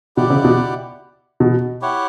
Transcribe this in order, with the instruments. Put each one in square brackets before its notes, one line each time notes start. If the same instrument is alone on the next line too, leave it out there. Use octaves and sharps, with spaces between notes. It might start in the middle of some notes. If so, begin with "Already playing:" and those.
[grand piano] B2 [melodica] E4 G4 D5 F#5
[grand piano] C#3
B2
B2
[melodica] E4 G4 C#5 F#5